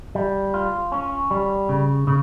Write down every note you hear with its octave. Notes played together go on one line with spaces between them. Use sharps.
G3
F4
C#4
G3
C#3
C#3